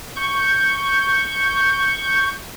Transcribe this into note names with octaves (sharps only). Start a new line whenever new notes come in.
C#6 G6